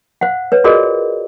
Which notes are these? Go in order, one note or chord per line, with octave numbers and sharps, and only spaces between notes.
C5 F5 F#5
B4 C#5
F4 F#4 G#4 A#4 D5 D#5